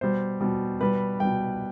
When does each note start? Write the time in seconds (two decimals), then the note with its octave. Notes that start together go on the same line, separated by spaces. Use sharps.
0.01 B2 G3 C5
0.41 B2 G3
0.80 B2 G3 B4
1.20 B2 G3 G5